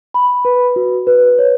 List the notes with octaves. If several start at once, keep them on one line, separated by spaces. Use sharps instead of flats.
B5
B4
F#4
B4
C#5